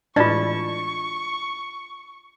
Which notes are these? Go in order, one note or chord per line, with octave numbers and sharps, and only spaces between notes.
A2 E3 G#3 D4 F4 D5 A5 C#6